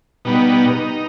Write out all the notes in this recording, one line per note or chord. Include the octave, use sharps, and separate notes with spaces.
B2 G3 B3 D#4